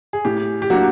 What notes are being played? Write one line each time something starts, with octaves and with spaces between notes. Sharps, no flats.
G#4
A2 G4
G4
F#3 A#3 D4 F#4